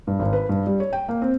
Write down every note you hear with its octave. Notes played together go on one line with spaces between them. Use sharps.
G2
G#1
B4
G2
G3
C#5
G5
A#3
C4